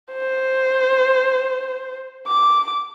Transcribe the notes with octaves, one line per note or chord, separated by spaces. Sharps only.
C5
D6